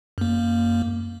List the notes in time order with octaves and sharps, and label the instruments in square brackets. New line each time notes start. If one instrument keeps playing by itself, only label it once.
[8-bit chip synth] F#2 A#3